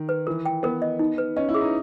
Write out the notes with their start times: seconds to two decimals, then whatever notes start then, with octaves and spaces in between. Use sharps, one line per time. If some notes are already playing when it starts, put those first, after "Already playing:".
Already playing: D#3
0.09 B4
0.27 E3 A#4
0.46 G5
0.63 B3 A#4
0.82 D#5
0.99 D#4
1.18 B4
1.36 C#4 D#5
1.49 E4
1.54 G#4
1.61 D#4